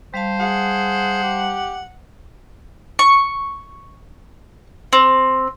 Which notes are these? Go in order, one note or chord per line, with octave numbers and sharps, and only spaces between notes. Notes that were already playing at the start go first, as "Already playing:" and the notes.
G3 C5 F5 A5
G#4 F#5
G4
C#6
C4